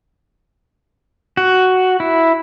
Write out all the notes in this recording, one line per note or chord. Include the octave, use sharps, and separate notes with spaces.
F#4
E4